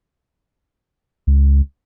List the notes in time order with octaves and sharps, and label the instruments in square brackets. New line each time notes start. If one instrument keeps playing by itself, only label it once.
[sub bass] C#2